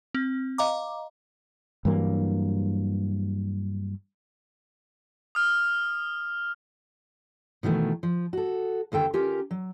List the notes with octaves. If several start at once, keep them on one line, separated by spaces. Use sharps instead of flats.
C4
D#5 F5 A#5 D6
G2 E3 F#3 A#3
D#6 F6
B2 D#3 E3 A3
F3
F#4 A4
D#2 D3 A4 G5
C#4 F4 G4 A#4
F#3